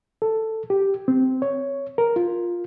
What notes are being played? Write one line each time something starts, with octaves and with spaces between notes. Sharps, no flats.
A4
G4
C4
C#5
A#4
F4